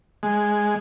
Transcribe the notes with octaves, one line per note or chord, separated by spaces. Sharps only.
G#3